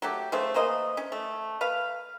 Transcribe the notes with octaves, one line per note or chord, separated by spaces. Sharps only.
F#3 A3 G4
C#3 A3 C5
E3 A#3 C5 D#5
C#4
A3
B4 F5